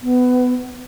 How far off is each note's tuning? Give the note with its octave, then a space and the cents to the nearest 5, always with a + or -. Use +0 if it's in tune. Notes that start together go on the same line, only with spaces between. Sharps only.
B3 +20